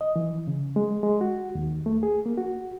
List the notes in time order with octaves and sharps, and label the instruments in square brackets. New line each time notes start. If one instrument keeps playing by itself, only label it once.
[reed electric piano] D#5
E3
C#3
G#3
G#3
F#4
D#2
A3
G#4
A#3
F#4